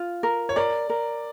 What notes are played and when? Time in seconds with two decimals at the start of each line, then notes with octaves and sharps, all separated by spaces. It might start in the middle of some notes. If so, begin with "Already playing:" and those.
Already playing: F4
0.23 A#4
0.49 C#5
0.56 A#4 D5
0.90 A#4